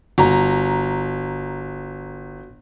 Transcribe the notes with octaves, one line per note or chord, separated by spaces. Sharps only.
G1 F#4 A#5